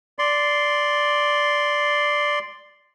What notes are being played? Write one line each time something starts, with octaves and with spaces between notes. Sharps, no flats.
D5 C6